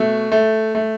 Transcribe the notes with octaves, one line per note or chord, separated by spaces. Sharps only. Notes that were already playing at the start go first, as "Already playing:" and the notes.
Already playing: B2 A3
A3
A3